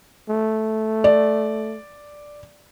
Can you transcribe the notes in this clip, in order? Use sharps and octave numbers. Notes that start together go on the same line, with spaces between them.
A3
D5